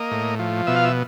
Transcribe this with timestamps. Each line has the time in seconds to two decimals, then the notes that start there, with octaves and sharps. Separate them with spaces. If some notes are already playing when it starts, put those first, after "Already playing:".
Already playing: A#3 D#5
0.11 A2
0.39 F3
0.67 B2 E5
0.76 F5
0.85 E5